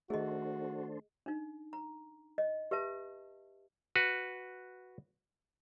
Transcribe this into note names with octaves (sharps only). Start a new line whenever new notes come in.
D#3 A3 D4 F#4 G#4 A4 C5 D#5
D4 D#4
A#5
D#5
G4 B4 E5 A5
F#4 B4